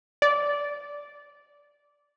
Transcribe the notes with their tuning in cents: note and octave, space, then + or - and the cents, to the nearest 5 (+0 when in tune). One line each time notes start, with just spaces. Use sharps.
D5 -10